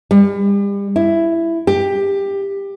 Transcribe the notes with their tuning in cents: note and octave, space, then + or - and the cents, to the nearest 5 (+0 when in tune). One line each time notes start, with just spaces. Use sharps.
G3 +35
E4 +10
G4 +15